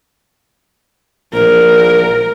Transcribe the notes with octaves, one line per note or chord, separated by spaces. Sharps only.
A#1 A#4